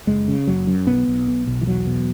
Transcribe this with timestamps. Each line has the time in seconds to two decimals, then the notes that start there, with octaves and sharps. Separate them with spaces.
0.07 F#1 G#3
0.28 C#3
0.47 F#1 F#3
0.67 F#2
0.87 B1 B3
1.08 B1
1.27 B2
1.47 B1
1.61 E3
1.67 E2 F#3
1.86 B2